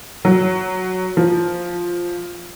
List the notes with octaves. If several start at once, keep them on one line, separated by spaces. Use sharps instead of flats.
F#3
F3